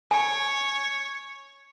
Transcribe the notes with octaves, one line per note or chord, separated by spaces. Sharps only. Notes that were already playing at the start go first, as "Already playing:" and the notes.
C#5 G#5